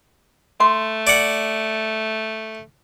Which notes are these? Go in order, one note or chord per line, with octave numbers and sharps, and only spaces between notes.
A3 C6
D5 F#5